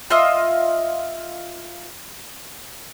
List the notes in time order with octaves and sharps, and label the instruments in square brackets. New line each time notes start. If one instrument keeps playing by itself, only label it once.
[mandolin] F4 D#5 E5 D#6